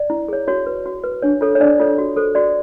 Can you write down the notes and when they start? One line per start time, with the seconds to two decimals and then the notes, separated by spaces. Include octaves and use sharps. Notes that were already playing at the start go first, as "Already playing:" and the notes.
Already playing: D5
0.10 E4
0.28 G#4 C#5
0.48 F#4 C#5
0.66 B4
0.86 F#4
1.04 B4
1.22 D4 C#5
1.41 F4 A4 C#5
1.55 C#5
1.60 D4 D5
1.80 F4 A4 C#5
1.98 F#4
2.16 A4 C5
2.35 F#4 D5